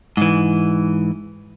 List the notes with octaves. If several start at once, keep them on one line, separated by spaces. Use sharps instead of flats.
G#2 E3